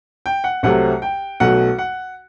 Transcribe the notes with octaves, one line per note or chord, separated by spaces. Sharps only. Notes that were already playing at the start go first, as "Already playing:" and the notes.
G5
F#5
C2 C3 F#3 A3 F#5
G5
B1 B2 F#3 A3 F#5
F#5